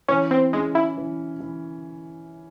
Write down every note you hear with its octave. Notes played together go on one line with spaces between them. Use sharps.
E3 C#4
C4
G#3 C#4
E4
E3
E3